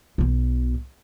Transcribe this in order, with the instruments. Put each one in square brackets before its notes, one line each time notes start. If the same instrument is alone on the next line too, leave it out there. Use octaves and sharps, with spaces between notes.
[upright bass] B1 B2